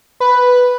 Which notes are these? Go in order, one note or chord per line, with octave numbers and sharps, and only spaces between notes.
B4